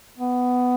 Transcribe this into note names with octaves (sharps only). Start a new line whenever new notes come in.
B3